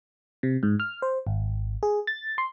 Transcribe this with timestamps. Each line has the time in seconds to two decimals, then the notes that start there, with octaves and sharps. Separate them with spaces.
0.43 C3
0.63 G#2
0.80 F6
1.02 C5
1.27 G#1
1.83 G#4
2.07 A6
2.38 C6